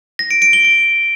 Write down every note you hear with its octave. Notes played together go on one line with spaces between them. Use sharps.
A#6
D7
D7
G7
D7